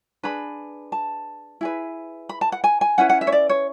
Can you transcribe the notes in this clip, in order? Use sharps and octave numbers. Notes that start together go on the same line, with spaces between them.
D4 G#4 B4 B5
A5
E4 G#4 B4
B5
A5
F#5
G#5
G#5
C#4 E4 B4 F#5
F#5
E5
C#5
D5
C#5